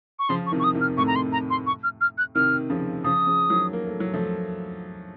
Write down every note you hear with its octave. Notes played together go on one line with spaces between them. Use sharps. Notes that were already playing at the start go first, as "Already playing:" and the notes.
C#6
C#3 F3 C6
C#6
C3 D#3
C#6
D#6
C3 D#3
F6
A2 C3 C#6
A#5
C6
A#5
C6
C#6
F6
F6
F#6
C3 D#3 F6
C#3 F3
C#3 F3 D#6
C#3 F3
D#3 F#3
A#3
A3
F#3
F3 A3